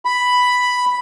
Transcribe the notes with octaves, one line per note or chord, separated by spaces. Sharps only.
B5